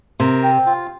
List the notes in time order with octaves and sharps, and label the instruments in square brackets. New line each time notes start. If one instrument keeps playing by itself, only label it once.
[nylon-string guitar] C3 [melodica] A#4
[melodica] C4
F4